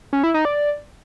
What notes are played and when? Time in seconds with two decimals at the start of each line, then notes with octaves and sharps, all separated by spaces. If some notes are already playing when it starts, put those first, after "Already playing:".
0.13 C#4
0.24 E4
0.34 D#4
0.45 D5